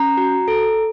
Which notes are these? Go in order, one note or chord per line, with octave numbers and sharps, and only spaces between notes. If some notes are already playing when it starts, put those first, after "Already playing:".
Already playing: C#4 A#5
F#4
A4